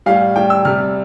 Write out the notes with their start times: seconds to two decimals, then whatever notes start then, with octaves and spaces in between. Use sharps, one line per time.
0.06 A2 G3 F5
0.36 A2 G3 G5
0.50 E6
0.65 C3 G3 F6